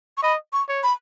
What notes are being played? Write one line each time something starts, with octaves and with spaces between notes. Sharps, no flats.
C#6
D#5 B5
C#6
C#5
B5